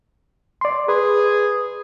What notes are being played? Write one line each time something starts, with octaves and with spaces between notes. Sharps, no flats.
D5 C6
G#4 B4